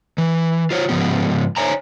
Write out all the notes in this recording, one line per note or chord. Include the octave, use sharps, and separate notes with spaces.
E3
F4 C5 C#5
G#2 C#3 F3 B3 G4
D#4 C5 C#5 G#5 A#5